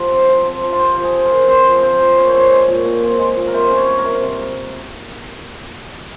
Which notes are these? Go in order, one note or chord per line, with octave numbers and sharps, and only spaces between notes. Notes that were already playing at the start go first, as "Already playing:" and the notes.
Already playing: F3 F4 G4
C4
F3
C4
F3
F4
C4 G4
F3
G#4
C4
A#4
F3
C4 C5
F3
C4 C5
F3
A#2 C#5
C5
C4
C#5
G#3
A#2
A#2
C4
G#3
A#2
A#4
C3 C5
C#4
C#5
G3
A#4
C3
C3